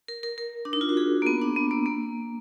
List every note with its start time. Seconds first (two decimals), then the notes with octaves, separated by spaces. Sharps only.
0.08 A#4
0.23 A#4
0.38 A#4
0.65 D4
0.73 D#4
0.81 F4
0.89 F#4
0.97 G#4
1.22 A#3
1.26 B3
1.42 D4
1.56 B3
1.71 A#3
1.86 A#3